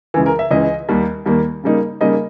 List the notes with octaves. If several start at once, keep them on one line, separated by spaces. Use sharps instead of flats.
C#2 C#3 E3
A#4
E5
C#2 C#3 E3 D#5
D#2 D#3 G3 A#3
D#2 D#3 G3 A#3
C#3 G3 A#3 D#4
C#3 G3 A#3 D#4 D#5